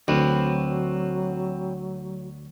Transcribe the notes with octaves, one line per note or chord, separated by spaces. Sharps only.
D2 F#3 C4 B4